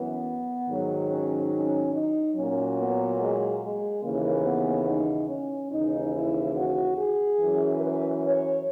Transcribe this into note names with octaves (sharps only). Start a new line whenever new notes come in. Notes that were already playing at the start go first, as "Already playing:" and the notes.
Already playing: F#2 E3 B3
G#2 D#3 F#3
C#4
C#4
D#4
A#2 F#3 C#4
B3
G#3
G#3
D#2 C#3 E3 A#3
B3
D#4
C#4
D#2 C#3 E3 D#4
E4
F#4
G#4
F#2 E3
B4
C#5